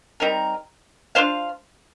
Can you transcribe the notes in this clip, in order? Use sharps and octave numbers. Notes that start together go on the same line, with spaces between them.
G3 C4 D#4 A#4
D4 F4 C5 F5